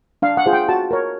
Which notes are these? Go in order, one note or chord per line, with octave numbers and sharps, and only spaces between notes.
D4 F5
F#5
F4 G#4 C5
G5
F#4 A5
A#4 C#5